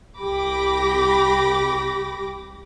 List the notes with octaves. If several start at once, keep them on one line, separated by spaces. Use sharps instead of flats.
C2 G4 B5 D6 A#6